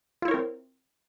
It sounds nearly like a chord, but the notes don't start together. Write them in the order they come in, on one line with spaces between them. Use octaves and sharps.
F4 E4 C#5 A#4 C4